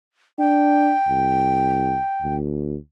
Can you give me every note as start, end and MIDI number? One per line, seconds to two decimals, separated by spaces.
0.39 0.93 62
0.39 2.36 79
1.08 1.99 36
2.22 2.77 38